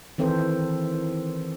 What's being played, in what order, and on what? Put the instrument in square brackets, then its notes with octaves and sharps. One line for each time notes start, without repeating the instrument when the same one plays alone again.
[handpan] D#3 E3 C4 A4 B4 C5